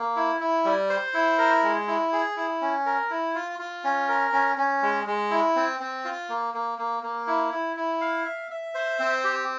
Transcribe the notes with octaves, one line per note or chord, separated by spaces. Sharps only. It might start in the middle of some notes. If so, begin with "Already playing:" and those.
Already playing: A#3
E4
E4
G3
C5
E4
A#4
G#3
E4
G#4
E4
C#4
A#4
E4
F4
F4
C#4
A#4
C#4
C#4
G#3
G#3
E4
C4
C4
F4
A#3
A#3
A#3
A#3
E4
E4
E4
F5
E5
E5
C5
C4
G4